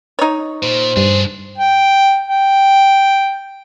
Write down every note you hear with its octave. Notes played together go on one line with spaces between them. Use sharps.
D#4 C#5
A#2 C5
G2 D4 G#4
G5
G5